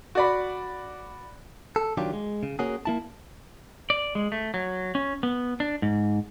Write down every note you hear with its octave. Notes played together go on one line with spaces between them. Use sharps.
F#4 D5 B5
A4
D#3 F#3 D4 F4 G4
G#3
C#3
A#3 C#4 F#4 G#4
A#3 E4 A5
D5
G#3
A3
F#3
C#4
B3
D4
G#2